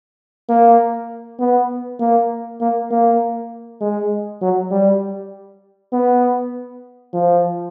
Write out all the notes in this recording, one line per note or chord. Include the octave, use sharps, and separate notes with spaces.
A#3
B3
A#3
A#3
A#3
G#3
F#3
G3
B3
F3